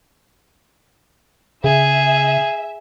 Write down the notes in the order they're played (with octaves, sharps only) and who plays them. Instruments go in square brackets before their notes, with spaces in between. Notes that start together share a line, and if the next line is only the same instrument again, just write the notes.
[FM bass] C#3 [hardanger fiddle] G#4 [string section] E5